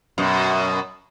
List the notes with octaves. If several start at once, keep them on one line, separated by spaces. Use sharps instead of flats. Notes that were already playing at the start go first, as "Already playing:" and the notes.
F#2 B2